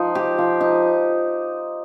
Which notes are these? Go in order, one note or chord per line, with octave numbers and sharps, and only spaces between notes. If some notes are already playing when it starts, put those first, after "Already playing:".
Already playing: F3 D#4
G4
F3
D#4